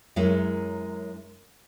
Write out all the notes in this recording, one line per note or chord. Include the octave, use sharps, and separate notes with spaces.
F#2 G#3 E4 A#4 C#5